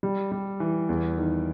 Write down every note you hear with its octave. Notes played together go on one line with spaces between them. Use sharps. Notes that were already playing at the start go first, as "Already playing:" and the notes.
G3
G3
E3
E2
D#3